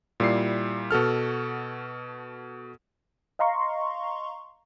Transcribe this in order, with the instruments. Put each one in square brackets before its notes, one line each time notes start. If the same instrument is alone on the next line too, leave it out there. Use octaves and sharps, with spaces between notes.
[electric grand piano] A#2 G3 E4 D5 C7
B2 F#4 A4 F6
[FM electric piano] D#5 F5 A#5 C6 C#6